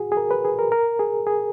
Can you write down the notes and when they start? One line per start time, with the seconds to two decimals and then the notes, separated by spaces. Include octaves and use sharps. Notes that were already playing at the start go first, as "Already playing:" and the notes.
Already playing: F#4 G#4
0.12 G#4
0.17 A#4
0.31 B4
0.45 G#4
0.59 A#4
0.72 A#4
0.99 G#4
1.27 G#4